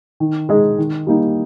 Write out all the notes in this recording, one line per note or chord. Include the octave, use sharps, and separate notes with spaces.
D#3
G#3 D#4 G#4 D#5
D#3
G3 A#3 D#4